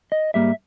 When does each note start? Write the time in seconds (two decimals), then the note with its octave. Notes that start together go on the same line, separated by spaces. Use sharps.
0.12 D#5
0.34 G#2 G3 A#3 E5